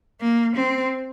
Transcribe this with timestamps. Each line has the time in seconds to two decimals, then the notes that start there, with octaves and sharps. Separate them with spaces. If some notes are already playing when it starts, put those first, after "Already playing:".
0.21 A#3
0.57 C4